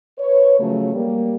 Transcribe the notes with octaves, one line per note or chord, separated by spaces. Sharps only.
B4 C#5
C#3 F3 F#3 A3
G3 A#3